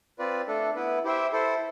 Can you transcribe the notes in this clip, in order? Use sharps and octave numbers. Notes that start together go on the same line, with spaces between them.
C4 F4 B4 D5
A3 D4 A4
B3 E4 B4
E4 G4 C5 E5 G5
E4 A4 C5